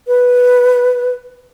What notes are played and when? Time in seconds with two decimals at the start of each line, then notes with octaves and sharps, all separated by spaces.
0.07 B4